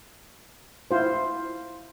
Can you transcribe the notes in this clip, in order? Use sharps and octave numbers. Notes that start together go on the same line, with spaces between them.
E4 F4 C5